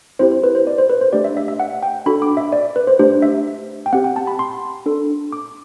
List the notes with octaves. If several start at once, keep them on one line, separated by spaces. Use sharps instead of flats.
C4 E4 G4 C5
C5
B4
C5
D5
C5
B4
C5
A3 D4 G4 D5
E5
E5
E5
F#5
G5
D4 F#4 A4 B5
D6
E5
D5
B4
C5
A3 D4 G4 C5
E5
G5
C4 G4 F#5
G5
A5
B5
C6
D4 A4
D6